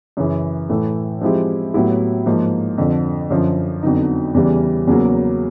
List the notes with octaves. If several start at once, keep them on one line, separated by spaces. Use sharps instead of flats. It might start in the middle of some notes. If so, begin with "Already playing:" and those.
F#2 C#3 E3
A2 E3 A3
F3 G#3 C4 E4 G4
A2 F#3 B3 E4 G4
G#2 F3 A#3
F2 D3 F3
F#2 D3 F3
F2 D3 F#3 B3 D#4
E2 C#3 E3 G3
E2 C#3 F#3 A#3